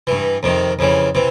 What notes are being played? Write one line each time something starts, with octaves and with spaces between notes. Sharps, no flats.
G2 E3
F2 C3 D#3
F2 C#3 E3
C3 E3